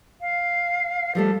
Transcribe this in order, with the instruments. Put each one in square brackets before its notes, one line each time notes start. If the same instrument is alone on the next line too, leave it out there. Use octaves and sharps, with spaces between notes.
[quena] F5
[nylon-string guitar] F3 G3 A3 [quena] A4